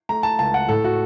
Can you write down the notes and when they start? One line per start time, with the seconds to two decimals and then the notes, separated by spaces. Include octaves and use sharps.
0.09 A3 A#5
0.23 A5
0.39 C#2 A5
0.54 F#5
0.69 A2 A4
0.84 F#4